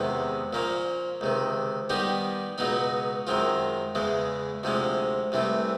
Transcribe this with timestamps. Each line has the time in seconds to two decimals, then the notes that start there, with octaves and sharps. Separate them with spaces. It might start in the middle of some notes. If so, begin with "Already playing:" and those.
Already playing: E2 C3 D#3 G#3 B3
0.53 A#2 F3 A#3 C#4
1.21 C#2 C3 D#3
1.89 D#3 G3 B3 D#4 G4
2.58 C#2 B2 F#3 B3 D#4
3.27 F#2 D#3 G#3 C4 F4
3.95 E2 C#3 E3 G#3
4.63 D2 C3 F3 G#3 C#4
5.32 C2 C3 E3 A3